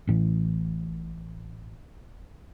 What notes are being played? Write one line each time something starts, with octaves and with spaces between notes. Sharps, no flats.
A1 A2 E3